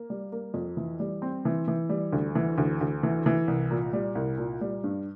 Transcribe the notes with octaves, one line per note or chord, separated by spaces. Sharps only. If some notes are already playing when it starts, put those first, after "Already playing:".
Already playing: A#3
G3
A#3
F2
E3
G3
C4
E3
E3
G3
D2
E3
D2
D2
E3
E3
C2
A#2
G3
C2
A#2
G3
G2